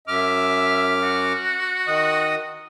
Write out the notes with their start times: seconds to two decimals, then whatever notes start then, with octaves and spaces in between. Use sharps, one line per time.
0.08 F#2 E5 D6 F6
1.03 F#4
1.87 D#3 D#5 D#6